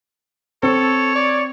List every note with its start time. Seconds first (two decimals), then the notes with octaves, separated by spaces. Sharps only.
0.63 C4 A4 C#5
1.15 D5